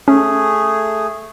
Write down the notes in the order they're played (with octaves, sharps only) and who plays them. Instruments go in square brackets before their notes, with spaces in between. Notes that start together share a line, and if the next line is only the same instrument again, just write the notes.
[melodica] A3 G#4 [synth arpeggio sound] C#4